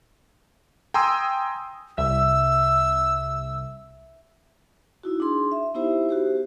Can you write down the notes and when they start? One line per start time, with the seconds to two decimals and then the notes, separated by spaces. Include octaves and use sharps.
0.94 G5 G#5 A#5 C6 D#6 E6
1.98 C2 E5 E6
5.03 D#4 E4 F#4
5.20 D4 G#4 C6
5.52 E5
5.74 B3 D#4 E4 G4 C5 E5
6.09 F#4 G4 C5